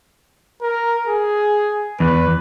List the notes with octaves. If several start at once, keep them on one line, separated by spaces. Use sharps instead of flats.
A#4
G#4
E2 B4